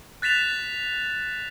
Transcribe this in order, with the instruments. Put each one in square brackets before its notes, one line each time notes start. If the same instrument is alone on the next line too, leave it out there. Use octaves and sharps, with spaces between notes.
[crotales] F#6 A6 B6 E7 F7